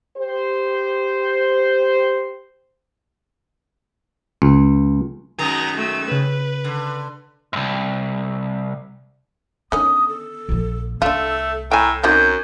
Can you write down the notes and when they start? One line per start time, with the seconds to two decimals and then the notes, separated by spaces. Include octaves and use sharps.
0.17 G4 C5
4.42 C#2
5.39 F#2 D#3 G#3 A#5 D#6
5.77 A3 E6
6.09 C#3 B4 A#6 D#7
6.64 D3
7.53 C2 F#2
9.72 D3 D#3 B3 C#4 D#6
10.09 A4
10.49 A#1 F3
11.02 C2 A3 D4 F4 A4
11.71 A2 G5 G#5 A#5
12.03 F#2 C4 D#4 F#4 G6